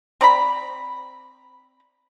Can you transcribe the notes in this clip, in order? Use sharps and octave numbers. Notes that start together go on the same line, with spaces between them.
C4 D5 A#5 B5